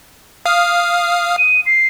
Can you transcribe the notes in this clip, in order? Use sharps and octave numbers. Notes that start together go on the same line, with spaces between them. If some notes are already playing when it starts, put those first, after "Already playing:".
F5 D#6 F6
D#7
C7